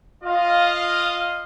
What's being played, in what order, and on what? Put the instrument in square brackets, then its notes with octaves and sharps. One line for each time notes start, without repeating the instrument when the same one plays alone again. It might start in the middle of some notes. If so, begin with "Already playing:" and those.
[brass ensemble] F4 D#5 F5